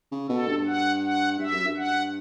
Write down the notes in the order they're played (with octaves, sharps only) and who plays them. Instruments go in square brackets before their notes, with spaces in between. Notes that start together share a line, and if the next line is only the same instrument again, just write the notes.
[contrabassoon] C#3
[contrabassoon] B2 [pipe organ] A4
[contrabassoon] G2
[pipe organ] F#5
F#5
[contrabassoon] G2 [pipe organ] E5
[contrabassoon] F#2
G2
[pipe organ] F#5